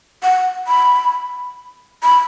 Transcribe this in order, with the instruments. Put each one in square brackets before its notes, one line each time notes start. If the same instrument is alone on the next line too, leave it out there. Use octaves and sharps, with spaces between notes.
[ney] F#5
B5
B5